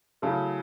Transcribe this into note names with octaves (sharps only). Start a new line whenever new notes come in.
C#3 F#3 A3 C#4 E4